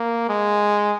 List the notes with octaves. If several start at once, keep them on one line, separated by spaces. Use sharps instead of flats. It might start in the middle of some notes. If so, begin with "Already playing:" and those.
Already playing: A#3
G#3